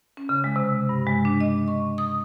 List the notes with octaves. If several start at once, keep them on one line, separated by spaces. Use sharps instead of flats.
C#4
C#3
G#3
C3
G2
G#3
D4
D#5
C#6
D#6